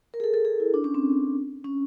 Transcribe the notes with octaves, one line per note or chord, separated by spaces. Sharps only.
A#4
G#4
A4
A4
G#4
E4
D4
C#4
C4
C#4